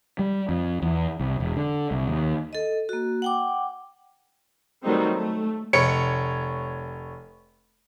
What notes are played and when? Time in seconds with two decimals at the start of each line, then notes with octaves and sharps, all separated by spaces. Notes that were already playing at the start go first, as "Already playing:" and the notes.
0.19 G3
0.49 F2
0.82 E2
1.20 C2
1.40 E1
1.56 D3
1.91 C2
2.07 D#2
2.53 A4 D#5
2.89 A#3 F#4
3.22 F#5 G5 D6
4.82 D#3 F#3 G3 A3 C4 D#4
5.16 A3
5.73 F1 C#5 C#7